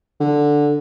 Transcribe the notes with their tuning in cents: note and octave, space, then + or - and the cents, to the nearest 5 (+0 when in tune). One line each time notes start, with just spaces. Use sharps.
D3 +0